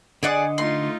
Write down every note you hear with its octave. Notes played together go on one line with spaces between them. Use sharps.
D3 G#4 D5 D#5 F#5 D#6
A3 D#4 F4 C6